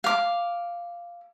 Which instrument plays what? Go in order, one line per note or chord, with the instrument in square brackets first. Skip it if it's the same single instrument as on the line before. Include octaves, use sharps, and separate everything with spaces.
[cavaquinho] F5 D6